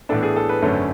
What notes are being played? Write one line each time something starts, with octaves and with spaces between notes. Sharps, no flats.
A2 E3 B3 D4 A4
G#4
A4
B4
G#1 F#2 D3 A3 C#4